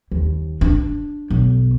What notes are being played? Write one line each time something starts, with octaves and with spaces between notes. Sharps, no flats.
D#2
D4
B1